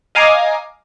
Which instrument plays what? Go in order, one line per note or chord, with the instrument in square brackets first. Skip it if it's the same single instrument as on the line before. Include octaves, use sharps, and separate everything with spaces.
[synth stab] D#5 F5 G#5 A#5 D6 D#6